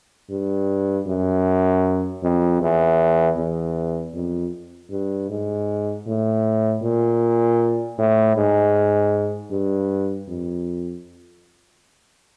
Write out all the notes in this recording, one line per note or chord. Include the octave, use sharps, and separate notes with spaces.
G2
F#2
F2
E2
E2
F2
G2
G#2
A2
A#2
A2
G#2
G2
F2